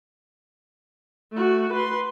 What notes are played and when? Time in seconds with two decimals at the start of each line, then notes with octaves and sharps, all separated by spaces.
1.32 A3 F#4
1.73 B4 C6